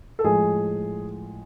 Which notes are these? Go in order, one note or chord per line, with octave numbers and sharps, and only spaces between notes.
A4
A2 F3 G#3 G#4